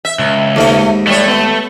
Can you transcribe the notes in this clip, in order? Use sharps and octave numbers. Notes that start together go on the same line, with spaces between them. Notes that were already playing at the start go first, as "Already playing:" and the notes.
E5
C#2
D#2 G#2 A3 B5
G3 A3 C#5
B3